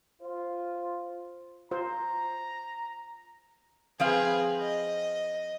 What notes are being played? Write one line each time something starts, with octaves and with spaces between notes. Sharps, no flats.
F4 C5
F4 C5 A#5
F3 C4 G#4 B4 F5
D#5